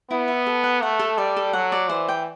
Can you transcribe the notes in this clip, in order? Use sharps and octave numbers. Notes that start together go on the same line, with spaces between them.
B3 E4
E5
A4
F#5
A3 F#5
A4
G3 D5
A4
F#3 F#5
D5
E3 C5
G5